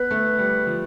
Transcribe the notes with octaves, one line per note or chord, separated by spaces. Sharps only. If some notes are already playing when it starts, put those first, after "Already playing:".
Already playing: B3 B4
A3
G3
F3